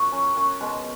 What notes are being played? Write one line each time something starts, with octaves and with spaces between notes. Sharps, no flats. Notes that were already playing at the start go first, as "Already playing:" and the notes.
Already playing: F#2 F#4
F#3 C#4
F#2 C#4
B2 G#3